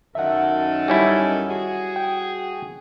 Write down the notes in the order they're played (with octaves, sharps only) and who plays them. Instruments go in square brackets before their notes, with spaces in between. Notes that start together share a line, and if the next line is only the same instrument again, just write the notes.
[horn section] F#2 D#3 A4 [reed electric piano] E5 F#5
[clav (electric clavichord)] G3 C#4 E4
[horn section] F#4 G#4
[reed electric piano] G5